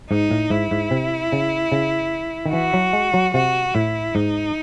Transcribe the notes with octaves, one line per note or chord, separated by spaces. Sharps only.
G#2 D#4
A2
G#2 E4
G#2
C3
C#3
C#3
D#3
E3 F#4
F#3
G#3
F#3
C3 F#4
A2 E4
G#2 D#4